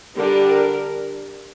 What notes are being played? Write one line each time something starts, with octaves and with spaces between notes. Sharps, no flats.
D3 G3 D4 A#4
A#4